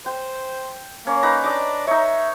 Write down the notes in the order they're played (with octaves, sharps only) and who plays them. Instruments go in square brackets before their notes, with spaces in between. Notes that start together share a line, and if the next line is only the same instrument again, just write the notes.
[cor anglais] C5 [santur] G5
[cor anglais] A#3 [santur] C#4
[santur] D#4 B4 A#5
[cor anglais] D4 [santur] D#5 D6
[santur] D#4 C#5 [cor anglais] E5